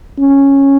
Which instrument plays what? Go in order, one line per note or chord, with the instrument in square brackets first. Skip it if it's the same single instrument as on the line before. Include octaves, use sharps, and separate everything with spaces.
[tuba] C#4